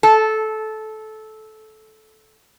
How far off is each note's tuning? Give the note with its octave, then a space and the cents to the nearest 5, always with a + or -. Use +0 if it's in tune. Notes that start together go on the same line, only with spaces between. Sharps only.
A4 -15